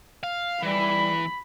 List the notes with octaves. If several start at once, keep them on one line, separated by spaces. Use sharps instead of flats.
F5
E3 G3 B5